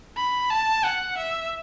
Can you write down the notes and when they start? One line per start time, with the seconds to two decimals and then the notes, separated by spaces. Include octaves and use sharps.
0.18 B5
0.51 A5
0.85 F#5
1.18 E5